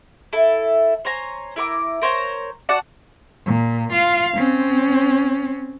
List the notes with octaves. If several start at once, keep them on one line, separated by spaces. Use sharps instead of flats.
E4 A4
C5 C#5 G#5 A#5
E4 A#4 C#6 D6
A#4 C5 C#5 A#5
F#4 D5 F#5 A5
A#2
F4 F5
C4 C#4